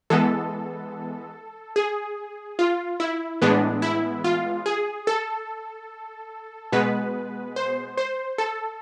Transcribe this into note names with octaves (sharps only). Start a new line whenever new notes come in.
E3 G#3 B3 A4
G#4
F4
E4
A2 E3 G#3 B3 D4
E4
F4
G#4
A4
B2 G#3 B3 B4
C5
C5
A4